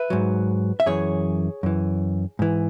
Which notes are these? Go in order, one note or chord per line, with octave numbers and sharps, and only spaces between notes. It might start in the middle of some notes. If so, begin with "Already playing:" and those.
Already playing: B4 E5
G#2 F#3
E5
F#2 E3 G#4 C#5
F#2 E3
G#2 E3